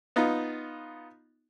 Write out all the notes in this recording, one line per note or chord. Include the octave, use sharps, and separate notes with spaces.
B3 D#4 F4